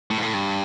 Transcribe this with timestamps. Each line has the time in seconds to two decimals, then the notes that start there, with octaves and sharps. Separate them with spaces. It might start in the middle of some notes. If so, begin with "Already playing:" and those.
0.11 A2
0.18 G#2
0.22 A2
0.34 G2